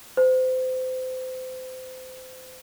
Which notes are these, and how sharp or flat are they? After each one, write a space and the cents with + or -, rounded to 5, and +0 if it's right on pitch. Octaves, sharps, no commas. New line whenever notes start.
C5 -30